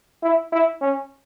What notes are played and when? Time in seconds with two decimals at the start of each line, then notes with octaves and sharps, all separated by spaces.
0.23 E4
0.52 E4
0.81 C#4